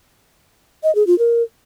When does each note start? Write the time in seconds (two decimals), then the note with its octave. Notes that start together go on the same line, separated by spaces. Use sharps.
0.83 D#5
0.95 G#4
1.07 F4
1.19 A#4